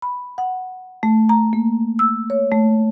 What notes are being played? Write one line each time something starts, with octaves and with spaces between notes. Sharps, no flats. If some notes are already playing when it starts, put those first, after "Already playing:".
B5
F#5
A3
A#5
A#3
E6
C#5
A3